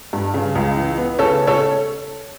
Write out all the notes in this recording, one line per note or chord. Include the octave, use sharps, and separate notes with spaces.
G2
C#3
C#2
E3
B3
C#3 A4 C#5
A4 C#5